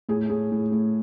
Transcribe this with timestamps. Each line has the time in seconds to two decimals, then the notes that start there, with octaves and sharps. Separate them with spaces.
0.09 A2 G#4
0.30 A2 G#4
0.52 A2
0.72 A2